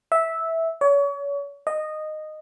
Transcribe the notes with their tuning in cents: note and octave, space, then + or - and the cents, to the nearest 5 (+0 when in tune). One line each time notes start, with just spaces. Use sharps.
E5 -10
C#5 +35
D#5 -10